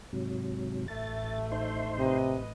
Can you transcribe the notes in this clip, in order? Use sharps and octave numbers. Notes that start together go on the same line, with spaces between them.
G#2 C3 F#3
A1 A3 E5 A6
D#4 C5 C6
C3 B4 D#5